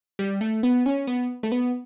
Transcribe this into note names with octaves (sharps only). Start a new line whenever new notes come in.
G3
A3
B3
C#4
B3
A3
B3